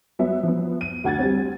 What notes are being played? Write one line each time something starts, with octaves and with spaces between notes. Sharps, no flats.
F#3 B3 E5
F3 B3
D#7
D2 F#5 G#6 A6
G3 C4